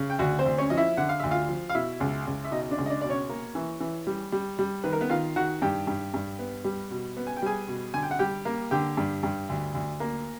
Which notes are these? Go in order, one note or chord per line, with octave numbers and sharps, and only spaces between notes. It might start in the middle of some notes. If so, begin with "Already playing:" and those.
Already playing: C#3
G5
D2 F#4 F#5
C4 C5
D2
C#4 C#5
F3 D#5
E4 E5
D3 F#5
F5
D2 E5
F4 F5
F3
F5
B2 E4 E5
C#2
C#2
E5
B2 D#4 D#5
D#5
D4 D5
C#2
D#5
D4 D5
B2 D5
C#4 C#5
A#3
E3
E3
G3
G3
G3
D#3 B4
A#4
B3 B4
D#3 F4 F5
D#3 F#4 F#5
G2 G4 G5
G2
G2
B3
G3
B2
B3
G#5
G5
G3 G#4 G#5
B2
D3 G#5
G5
F#5
G3 G4 G5
A#3
D3 G4 G5
G2
G2
D2
D2
A#3